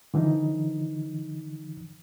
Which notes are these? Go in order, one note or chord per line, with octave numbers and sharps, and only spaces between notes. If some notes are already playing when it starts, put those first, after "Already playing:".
D3 E3 F3 D#4